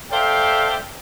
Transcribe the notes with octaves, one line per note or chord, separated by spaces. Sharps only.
A4 C5 D5 E5 F5 G5